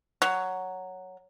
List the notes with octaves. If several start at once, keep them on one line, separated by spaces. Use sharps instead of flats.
F#3